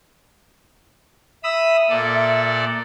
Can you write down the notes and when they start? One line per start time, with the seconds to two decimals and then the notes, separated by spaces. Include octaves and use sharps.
1.44 E5 B5 D#6 E6
1.90 A#2 A4 D5